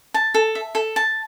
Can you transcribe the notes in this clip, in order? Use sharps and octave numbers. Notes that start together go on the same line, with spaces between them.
A5
A4
E5
A4
A5